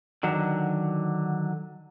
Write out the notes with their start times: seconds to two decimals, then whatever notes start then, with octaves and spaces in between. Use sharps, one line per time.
0.23 D3 D#3 F#3